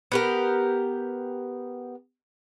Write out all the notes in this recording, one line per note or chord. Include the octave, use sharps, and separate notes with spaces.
B3 G4 A#4